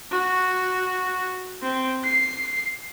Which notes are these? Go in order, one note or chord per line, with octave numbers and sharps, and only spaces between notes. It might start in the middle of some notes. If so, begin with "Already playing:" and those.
F#4
C4
C7